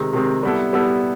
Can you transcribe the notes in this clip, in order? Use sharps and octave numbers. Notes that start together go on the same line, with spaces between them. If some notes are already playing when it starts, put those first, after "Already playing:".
Already playing: C3 D#3 G#3 C4
C3 D#3 G#3 C4
G3 B3 E4 A4
G3 B3 E4 A4